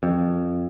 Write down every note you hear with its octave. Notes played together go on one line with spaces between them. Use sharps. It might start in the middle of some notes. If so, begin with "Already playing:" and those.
F2